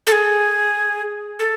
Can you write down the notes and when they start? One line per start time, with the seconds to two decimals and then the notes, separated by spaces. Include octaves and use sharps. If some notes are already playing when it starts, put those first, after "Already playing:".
0.07 A4
0.12 G#4
1.39 A4